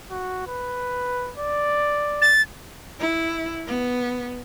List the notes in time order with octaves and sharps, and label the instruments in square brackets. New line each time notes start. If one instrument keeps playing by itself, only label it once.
[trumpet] F#4
B4
D5
[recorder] A6
[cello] E4
B3